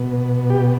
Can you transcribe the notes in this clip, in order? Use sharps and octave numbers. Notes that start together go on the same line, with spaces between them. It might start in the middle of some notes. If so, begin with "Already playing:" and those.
Already playing: B2
G4